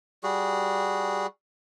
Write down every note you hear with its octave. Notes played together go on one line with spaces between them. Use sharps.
G3 F#4 G#4